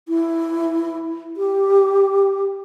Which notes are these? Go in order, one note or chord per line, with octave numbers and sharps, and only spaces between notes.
E4
G4